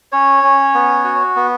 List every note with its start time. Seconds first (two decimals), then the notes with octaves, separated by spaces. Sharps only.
0.12 C#4 C#5
0.43 C#4
0.74 B3
1.04 F#4
1.36 B3